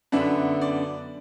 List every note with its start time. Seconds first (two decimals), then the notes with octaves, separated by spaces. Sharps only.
0.12 F#2 D3 B3 D4 E5
0.61 D5